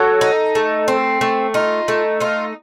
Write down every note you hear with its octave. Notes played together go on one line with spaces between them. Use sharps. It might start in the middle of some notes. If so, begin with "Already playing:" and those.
Already playing: F#3 A4
D#4
A3
C4
A3
D#4 F4
A3
D#4 F4